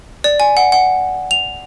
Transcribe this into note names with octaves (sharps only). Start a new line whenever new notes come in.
D5
G#5
F#5
F#5
F7